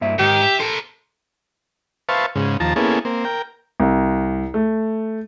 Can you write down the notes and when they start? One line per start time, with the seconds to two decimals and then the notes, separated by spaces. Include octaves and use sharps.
0.01 G2 A#3 E5
0.19 G#2 D#3 G4
0.42 E5
0.60 A4 A#4 C5
2.09 B4 C5 E5 F5 A5 C#6
2.35 G#2 C#3
2.60 D#2 F3 A5 A#5
2.76 A#3 B3 C#4 E4 G#4 A4
3.05 A#3 C4
3.25 A#4 G5
3.80 C2
4.54 A3